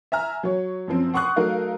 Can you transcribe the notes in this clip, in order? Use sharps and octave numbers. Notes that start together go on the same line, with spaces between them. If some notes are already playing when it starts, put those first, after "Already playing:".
E5 G#5 A#5 F6
F#3 C#5
F#2 F3 C4
F#5 C6 C#6 D#6 F#6
F#3 A3 D#4 A#4 F5